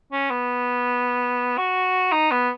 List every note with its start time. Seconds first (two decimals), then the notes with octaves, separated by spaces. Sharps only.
0.12 C#4
0.30 B3
1.58 F#4
2.12 D#4
2.31 B3